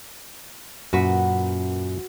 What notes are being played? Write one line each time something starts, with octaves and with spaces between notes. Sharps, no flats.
F#2 A#2 F#4 B4